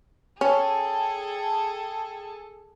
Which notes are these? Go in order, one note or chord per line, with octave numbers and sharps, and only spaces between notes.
C#4 G#4 A4 G5